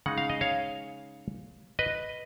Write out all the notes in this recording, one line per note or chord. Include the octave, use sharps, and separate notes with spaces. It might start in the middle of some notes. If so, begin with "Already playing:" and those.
C#3 G#3 D#4 F#5
F5
D#5
C#5 F5
B4 D#5